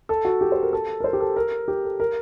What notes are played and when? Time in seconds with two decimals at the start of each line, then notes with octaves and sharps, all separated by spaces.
0.09 A4
0.25 F#4
0.41 G4
0.52 C5
0.62 A#4
0.73 A4
1.00 A#4
1.04 C5
1.13 G4
1.20 A4
1.36 A#4
1.68 G4
1.84 A4
2.00 A#4